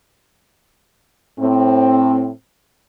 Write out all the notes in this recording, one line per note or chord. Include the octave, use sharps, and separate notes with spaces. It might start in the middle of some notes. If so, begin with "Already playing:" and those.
A2 C4